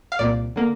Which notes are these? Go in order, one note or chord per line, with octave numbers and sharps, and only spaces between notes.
F5
C2 A#2 A#3 D5
D3 A#3